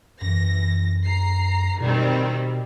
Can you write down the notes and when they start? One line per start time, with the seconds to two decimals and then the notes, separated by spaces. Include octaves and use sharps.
0.21 F#2 E3 A#6
1.06 A#5 C7
1.81 B2 D#3 G3 C4